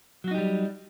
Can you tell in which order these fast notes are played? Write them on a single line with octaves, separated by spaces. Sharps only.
F#3 F#4 D#4 G4 G3